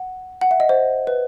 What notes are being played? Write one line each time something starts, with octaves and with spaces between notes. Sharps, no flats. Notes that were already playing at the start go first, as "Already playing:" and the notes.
Already playing: F#5
F#5
E5
D#5
C5
B4